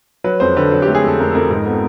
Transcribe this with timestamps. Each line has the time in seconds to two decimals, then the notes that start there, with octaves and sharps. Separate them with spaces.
0.24 F#3 B4
0.40 F2 C5
0.56 D3 B4
0.72 F#3
0.82 A3 G4
0.95 G#4
1.04 F2 A4
1.19 F2 A#4
1.31 A4
1.35 F2 A#4
1.50 G#2
1.66 B3